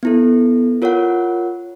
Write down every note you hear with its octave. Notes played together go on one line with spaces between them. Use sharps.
B3 E4 A4
F4 A#4 C#5 F#5